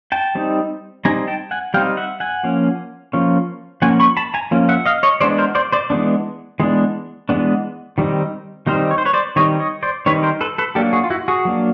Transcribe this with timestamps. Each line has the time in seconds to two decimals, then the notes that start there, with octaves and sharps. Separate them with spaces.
0.12 G5 A5
0.35 G3 C4 D#4
1.05 G3 C4 D#4 G#5 A#5
1.28 G5 A5
1.51 F#5 G#5
1.74 G3 C4 D#4 F5 G5
1.97 E5 F#5
2.20 F#5 G#5
2.43 F3 A#3 C#4
3.13 F3 A#3 C#4
3.82 F3 A#3 C#4 F#5 G#5
4.00 B5 C#6
4.17 A5 B5
4.34 G#5 A#5
4.51 F3 A#3 C#4
4.69 E5 F#5
4.86 D#5 F5
5.03 C#5 D#5
5.21 E3 G#3 B3 D4 C5 D5
5.38 A#4 C5
5.55 C5 D5
5.72 C5 D5
5.90 E3 G#3 B3 D4
6.60 E3 G#3 B3 D4
7.29 E3 G#3 B3 D4
7.98 D#3 G3 C4 D#4
8.67 D#3 G3 C4 D#4 A#4 C5
8.91 C#5
8.98 C5
9.05 B4 C#5
9.13 C5 D5
9.36 D#3 G3 C4 D#4 C#5 D#5
9.60 C#5 D#5
9.83 C5 D5
10.06 D#3 G3 C4 D#4 B4 C#5
10.23 A#4 C5
10.41 A4 B4
10.58 A4 B4
10.75 F#3 A#3 D4 G4 A4
10.93 F#4 G#4
11.04 F4
11.10 E4 F#4
11.28 F#4 G#4
11.45 F#3 A#3 D4